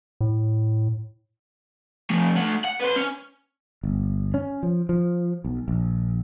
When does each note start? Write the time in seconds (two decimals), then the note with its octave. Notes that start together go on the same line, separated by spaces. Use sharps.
0.21 A2
2.10 F3 A3
2.36 A3 F#5
2.65 F#5
2.80 B4 C5
2.97 C#4
3.83 G1
4.34 C#4
4.63 F3
4.89 F3
5.44 B1
5.68 A#1